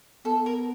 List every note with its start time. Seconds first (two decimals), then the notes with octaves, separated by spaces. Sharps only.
0.24 B3 A4
0.46 A#4